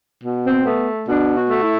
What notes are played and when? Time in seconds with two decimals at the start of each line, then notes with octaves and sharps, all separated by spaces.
0.24 B2
0.46 C4
0.66 A3 B3
1.07 B2 D4
1.36 F#4
1.50 A3
1.63 E4